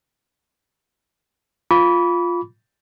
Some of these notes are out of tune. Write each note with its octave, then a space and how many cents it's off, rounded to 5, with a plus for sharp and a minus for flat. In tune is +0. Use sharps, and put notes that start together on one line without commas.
F4 +0 B5 -10 D6 -40